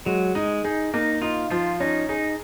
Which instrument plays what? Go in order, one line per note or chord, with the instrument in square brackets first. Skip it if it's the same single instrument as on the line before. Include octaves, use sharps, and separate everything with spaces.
[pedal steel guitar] F#3 [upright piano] G#3
[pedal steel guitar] G#3 [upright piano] D#4
[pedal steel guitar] D#4 [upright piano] G#4
[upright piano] A#3 [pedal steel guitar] D#4
[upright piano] D#4 [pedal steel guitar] F4
[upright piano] F3 [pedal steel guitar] F4
[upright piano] C#4 [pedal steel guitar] D#4
[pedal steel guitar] D#4 [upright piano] G#4